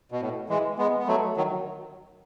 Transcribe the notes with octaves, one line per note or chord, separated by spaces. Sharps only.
B2
A2
E3 G#3
G#3 B3
B3
F#3 A3
D#3 F#3